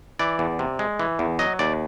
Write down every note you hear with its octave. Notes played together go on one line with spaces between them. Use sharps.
E3 D5
E2
C3
G#3
E3
E2
F#3 D#5
D#2 D5